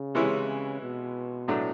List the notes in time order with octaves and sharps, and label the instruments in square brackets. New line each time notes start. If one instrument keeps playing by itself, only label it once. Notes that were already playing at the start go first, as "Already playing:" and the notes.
Already playing: [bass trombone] C#3
[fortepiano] C3 E3 G#3 C#4 E4
[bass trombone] B2
[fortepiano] A2 F#3 A3 D4